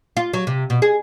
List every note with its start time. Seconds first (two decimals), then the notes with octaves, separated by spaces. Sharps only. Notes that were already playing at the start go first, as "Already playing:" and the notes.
0.17 F4
0.33 F#3
0.47 C3
0.70 B2
0.82 G#4